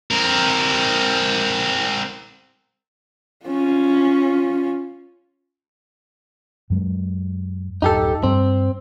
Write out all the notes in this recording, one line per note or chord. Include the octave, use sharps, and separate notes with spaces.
C4 A#4
C#4 F4
F#2 F#3 G#3
D1 F#2 D#4 G4 A4
G2 G3 C4